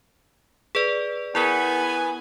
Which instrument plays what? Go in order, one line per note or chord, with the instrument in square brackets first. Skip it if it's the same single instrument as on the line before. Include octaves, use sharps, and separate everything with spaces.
[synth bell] G#4 B4 D5
[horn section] B3 G#5 [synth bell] E4 G#4 A#4